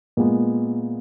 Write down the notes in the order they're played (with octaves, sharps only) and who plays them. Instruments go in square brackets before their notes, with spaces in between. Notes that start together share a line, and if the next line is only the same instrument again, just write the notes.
[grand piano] A#2 G#3 B3